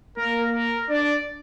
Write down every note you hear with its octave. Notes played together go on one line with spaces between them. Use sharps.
A#3 A#4
A#4
D4 D5